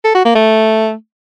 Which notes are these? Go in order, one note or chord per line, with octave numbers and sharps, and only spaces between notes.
A4
F#4
A#3
A3